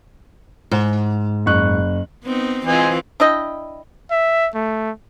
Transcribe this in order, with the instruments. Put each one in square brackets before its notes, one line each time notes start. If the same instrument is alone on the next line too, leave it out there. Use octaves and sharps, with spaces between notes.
[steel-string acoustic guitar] G#2
[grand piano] F#1 C#6 F#6
[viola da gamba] B3 C4 D#4
[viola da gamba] E3 C4 F4 [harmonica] C5 D#5 G#5
[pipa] D4 E4 D#5 G5
[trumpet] E5
A3